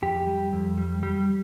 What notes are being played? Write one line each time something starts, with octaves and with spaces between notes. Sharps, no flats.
F2 G4
G3
F2
G3
G3